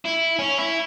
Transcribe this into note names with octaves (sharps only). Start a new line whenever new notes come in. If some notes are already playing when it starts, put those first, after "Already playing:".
E4
C#4
E4